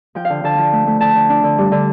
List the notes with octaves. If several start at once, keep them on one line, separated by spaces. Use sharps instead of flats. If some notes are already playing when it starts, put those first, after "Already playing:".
F3 G5
D3 F5
D3 A5
F3
A3
A3
D3 A5
D3
D4
D3
G3
D3